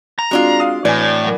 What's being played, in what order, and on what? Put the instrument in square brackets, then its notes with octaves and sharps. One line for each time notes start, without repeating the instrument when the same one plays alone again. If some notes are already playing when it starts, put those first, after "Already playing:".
[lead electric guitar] A#5
[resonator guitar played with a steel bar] G#3 D4 F4 [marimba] C4 F#4
[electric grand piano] F5 D#6
[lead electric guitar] A2 [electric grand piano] E3 G#5 [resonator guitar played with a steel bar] D5
[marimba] F#3 A#4